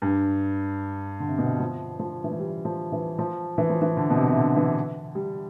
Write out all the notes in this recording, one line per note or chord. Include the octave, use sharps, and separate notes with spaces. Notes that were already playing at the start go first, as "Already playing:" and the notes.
G2
D3
C3
B2
C3
F3
F3
E3
F3
G3
F3
E3
F3
E3
F3
E3
D3
B2
C3
C3
D3
E3
G3